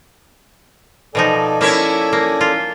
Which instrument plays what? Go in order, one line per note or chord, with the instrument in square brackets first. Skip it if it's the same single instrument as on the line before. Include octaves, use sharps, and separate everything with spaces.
[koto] B2 F3 D#4 [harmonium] A4 D5 G#5
[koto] A#3 [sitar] C#4 E4 C#5
[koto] A#3
F4